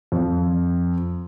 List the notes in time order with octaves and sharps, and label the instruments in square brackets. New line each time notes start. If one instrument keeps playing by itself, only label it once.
[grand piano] F2